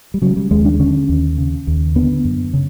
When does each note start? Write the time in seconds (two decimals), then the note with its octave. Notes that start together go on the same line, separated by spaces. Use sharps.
0.14 G3
0.22 C#3 F#3
0.37 G3
0.51 D#2 G#3
0.65 D4
0.80 D3 C#4
1.09 D#2
1.38 C#3
1.67 D#2
1.96 D3 B3
2.25 F#2
2.53 C#3